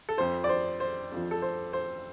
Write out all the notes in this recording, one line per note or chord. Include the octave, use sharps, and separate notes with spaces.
A4
F2 F3 C5
D5
C5
C5
F2 F3
A4
C5
C5